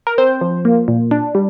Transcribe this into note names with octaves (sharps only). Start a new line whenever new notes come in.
A#4
C4 C5
F3
A#3
A#2
D4
G3